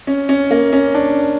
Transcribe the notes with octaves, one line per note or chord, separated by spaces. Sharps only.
C#4
C#4
A#3
C#4
D4